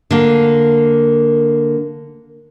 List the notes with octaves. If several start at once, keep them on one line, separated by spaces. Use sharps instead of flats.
D3 A#3